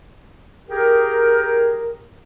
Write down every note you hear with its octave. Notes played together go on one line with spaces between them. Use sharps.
G4 G#4 A#4